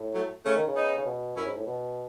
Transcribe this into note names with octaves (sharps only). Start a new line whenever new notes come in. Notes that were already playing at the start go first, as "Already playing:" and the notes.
Already playing: A2
F#3 A3
C#3 A3 C#4
D#3
C#3
B3 D#4
C#3
B2
F#2 C#4 E4
G#2
A2
B2